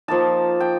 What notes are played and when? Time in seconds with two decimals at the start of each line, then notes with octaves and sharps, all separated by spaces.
0.08 F3 A#3 D#4 A5
0.60 G5